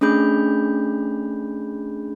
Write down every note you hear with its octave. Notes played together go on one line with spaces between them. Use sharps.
A3 C#4 D4 G#4 B5 G6